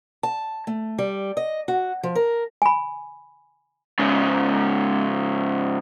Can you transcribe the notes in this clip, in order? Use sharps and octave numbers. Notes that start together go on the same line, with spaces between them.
A5
A3
G3
D#5
F#4
F3
A#4
G#5 B5
G#2 C#3